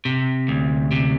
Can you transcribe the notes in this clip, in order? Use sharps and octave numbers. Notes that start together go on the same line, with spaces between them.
C3
D2
C3